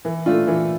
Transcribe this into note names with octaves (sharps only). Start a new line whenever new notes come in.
E3
A3 D4 F4
E3